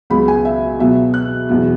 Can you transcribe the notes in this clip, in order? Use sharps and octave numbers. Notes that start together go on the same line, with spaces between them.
C#2 C#3 F#3 B3 B5
G#5
E5
B2 F#3 B3 E5
F#6
E2 B2 F#3 B3